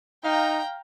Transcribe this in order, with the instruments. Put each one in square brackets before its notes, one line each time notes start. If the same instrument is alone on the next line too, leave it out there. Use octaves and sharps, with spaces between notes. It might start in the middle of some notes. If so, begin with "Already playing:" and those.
[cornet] D#4 [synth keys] F5 [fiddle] G5 A#5